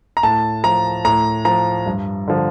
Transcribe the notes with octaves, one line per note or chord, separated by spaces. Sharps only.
A#5
A2 A5
F3 A#5
A2 A#5
F3 A#5
G2
D3 F3